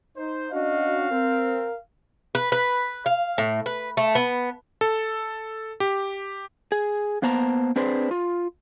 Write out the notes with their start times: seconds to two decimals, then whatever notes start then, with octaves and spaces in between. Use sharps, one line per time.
0.17 D#4 C5
0.52 C#4 D4 F#4 D#5 F5
1.11 C4 A#4
2.35 B4
2.52 B4
3.06 F5
3.38 A2
3.66 B4
3.97 A3
4.15 B3
4.81 A4
5.80 G4
6.72 G#4
7.22 A#3 B3 C5 A5 A#5
7.76 C4 D4 G#4 B4 C5
8.11 F4